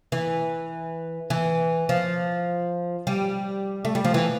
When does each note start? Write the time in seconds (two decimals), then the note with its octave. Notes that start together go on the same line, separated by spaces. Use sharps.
0.12 E3
1.30 E3
1.89 F3
3.07 G3
3.85 A3
3.95 G3
4.04 F3
4.14 E3